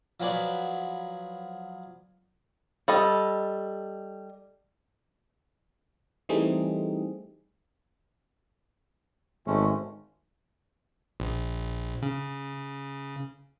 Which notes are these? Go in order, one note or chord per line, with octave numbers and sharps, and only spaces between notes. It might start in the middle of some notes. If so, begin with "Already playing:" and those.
F3 F#3 G#4 B4 D5
G3 A4 D#5
E3 G3 A3 C4 D#4 G#4
G#1 G#3 A3 C#4
A#1
C#3